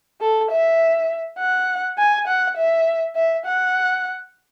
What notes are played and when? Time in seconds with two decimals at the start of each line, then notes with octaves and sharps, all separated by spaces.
0.21 A4
0.51 E5
1.38 F#5
1.98 G#5
2.27 F#5
2.57 E5
3.16 E5
3.46 F#5